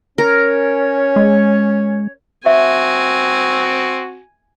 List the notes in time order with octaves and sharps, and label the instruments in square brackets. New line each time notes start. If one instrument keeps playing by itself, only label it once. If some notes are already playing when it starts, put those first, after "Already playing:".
[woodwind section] C#4 C#5 [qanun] A#4
[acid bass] G#3
[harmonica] C4 F#4 [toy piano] E5 [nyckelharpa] G#5